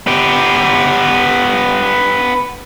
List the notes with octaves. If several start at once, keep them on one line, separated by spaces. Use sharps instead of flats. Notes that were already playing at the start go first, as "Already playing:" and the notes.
B3 G4